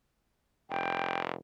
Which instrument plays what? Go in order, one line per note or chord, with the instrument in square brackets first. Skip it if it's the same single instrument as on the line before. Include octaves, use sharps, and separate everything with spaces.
[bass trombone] F1 [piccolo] G5